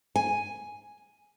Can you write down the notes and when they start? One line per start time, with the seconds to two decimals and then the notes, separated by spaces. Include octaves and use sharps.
0.16 G#5